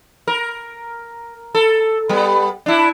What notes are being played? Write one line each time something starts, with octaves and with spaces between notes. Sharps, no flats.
A#4
A4
G3 B3
D4 E4